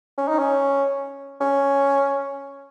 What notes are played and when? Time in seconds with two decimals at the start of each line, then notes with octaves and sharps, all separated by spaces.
0.18 C#4
0.28 D#4
0.39 C#4
1.41 C#4